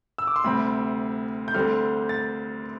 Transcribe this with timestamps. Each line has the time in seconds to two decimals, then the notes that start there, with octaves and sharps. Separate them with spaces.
0.18 E6
0.27 D6
0.36 C6
0.44 D2 C3 G3 C4 B5
1.48 G6
1.54 D2 D3 G3 C4 F6
2.09 A6